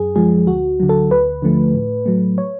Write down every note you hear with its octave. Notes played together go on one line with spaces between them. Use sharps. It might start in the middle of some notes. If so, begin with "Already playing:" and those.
Already playing: F#2 G#4
F3 G#3 G#4
D2 F#4
D3 F#3
A4
D2 B4
D3 F3 A3
A2
F#3 A3
C#5